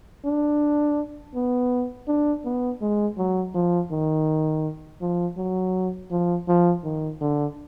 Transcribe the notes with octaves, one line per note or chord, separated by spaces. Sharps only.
D4
B3
D4
B3
G#3
F#3
F3
D#3
F3
F#3
F3
F3
D#3
D3